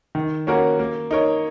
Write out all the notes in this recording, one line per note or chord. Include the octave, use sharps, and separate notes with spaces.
D#3
A#3 C#4 F#4 A#4
A#3
D#4 A#4 C#5